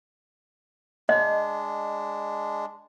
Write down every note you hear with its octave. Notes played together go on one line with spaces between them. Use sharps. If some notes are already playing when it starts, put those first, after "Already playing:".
G#3 D4 D#5